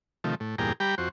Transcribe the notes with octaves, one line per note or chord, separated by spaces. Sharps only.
C3 D#3 F3 A3
A2
E2 G2 A#2 G#4 G5 A#5
G3 G4 G5 A#5 B5
F2 F#4 C5